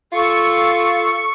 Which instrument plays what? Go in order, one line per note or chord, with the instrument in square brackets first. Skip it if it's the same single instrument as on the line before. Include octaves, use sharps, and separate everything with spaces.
[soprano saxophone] F4 [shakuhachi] A4 [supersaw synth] C#6